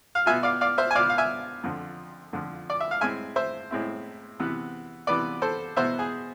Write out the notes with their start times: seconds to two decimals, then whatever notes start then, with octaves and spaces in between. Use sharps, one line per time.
0.15 F5
0.26 B2 B3 F4 E5 G#5
0.43 D5 F5
0.61 D5 F5
0.78 C5 E5
0.91 G#5
0.95 B2 B3 F4 D5 F5
1.09 F5
1.18 E5 G#5
1.64 F2 D3 F3
2.33 F2 D3 F3
2.70 D5
2.80 E5
2.91 F5
3.01 A2 G#3 C4 E4 E5 G#5
3.36 C5 E5
3.71 A2 G#3 C4 E4
4.40 C3 E3 B3
5.07 C3 E3 B3 B4 D5
5.42 A4 C5
5.76 E2 B2 B3 E4 C5 E5
5.99 G#4